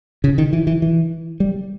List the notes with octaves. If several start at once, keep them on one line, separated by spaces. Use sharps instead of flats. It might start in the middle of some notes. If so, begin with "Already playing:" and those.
C#3
D#3
E3
E3
E3
G3